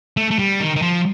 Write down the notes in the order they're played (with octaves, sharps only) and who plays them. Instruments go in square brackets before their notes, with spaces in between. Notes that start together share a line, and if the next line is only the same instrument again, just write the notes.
[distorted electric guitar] A3
A3
G3
D#3
D#3
F3